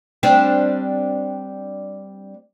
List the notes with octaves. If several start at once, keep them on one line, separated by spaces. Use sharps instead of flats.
G3 C4 D4